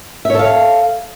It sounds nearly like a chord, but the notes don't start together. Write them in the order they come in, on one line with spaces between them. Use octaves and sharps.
E5 C#5 A4 F5